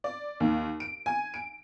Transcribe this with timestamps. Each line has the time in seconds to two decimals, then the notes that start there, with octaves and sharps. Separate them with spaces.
0.04 D5
0.40 D#2
0.80 D7
1.06 G#5
1.34 D7